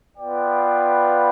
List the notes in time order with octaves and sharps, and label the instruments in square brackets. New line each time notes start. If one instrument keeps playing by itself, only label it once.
[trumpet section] B3 F4 B4 D5 G5